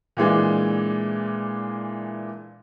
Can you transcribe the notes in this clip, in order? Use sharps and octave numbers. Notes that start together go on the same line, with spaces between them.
A#2 E3 G#3 D4